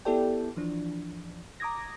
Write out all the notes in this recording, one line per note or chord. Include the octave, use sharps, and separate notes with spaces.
B3 E4 G4 A4 D5 G5
E3 F3 D4
A#5 D6 D#6 G#6 A#6